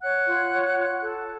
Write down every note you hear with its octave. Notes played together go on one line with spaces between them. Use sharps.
C#5 F#5 F#6
F4
C#5
F4
A4